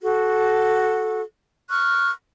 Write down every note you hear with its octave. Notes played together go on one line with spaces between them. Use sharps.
F#4 A4
C#6 F6 F#6